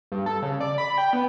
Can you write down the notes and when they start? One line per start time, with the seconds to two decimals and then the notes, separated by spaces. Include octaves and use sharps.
0.12 G2
0.26 A4
0.42 C#3
0.60 D5
0.78 B5
0.98 G5
1.13 B3